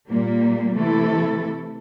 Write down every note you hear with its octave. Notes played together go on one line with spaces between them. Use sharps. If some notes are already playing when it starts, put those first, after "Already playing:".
A#2 G3 A#3
C3 E3 A3 E4 A4